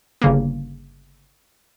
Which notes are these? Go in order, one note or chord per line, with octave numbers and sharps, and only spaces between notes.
G1 C#3 A#3